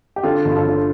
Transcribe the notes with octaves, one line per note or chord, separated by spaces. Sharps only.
G4
D3 F4 A4
G1
F4 A4
D3